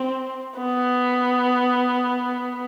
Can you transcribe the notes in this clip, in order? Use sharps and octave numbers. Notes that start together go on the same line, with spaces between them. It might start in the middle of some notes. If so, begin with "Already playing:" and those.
Already playing: C4
B3